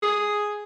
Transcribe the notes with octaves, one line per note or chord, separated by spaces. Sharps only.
G#4